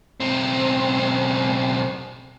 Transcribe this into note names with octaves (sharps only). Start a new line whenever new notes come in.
B1 C4